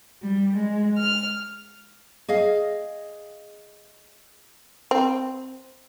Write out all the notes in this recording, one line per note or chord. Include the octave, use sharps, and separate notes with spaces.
G3
G#3
F6
G#4 D#5 F5
C4